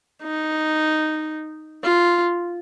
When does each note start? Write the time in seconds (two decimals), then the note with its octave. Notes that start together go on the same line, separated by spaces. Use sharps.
0.23 D#4
1.84 F4